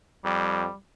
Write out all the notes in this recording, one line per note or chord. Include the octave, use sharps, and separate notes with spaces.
F2 G3